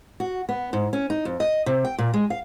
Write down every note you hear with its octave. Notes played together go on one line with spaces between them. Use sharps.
F#4
B3
G#2
C#4
D#4
F2
D#5
C3
G5
A#2
G#3
F5